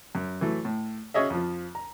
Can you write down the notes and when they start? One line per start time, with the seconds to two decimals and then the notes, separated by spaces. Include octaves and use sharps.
0.15 F#2
0.41 E3 F#3 A3
0.65 A2
1.14 C#4 F#4 G#4 C#5 D#5 E5
1.30 F2 F3
1.75 A#5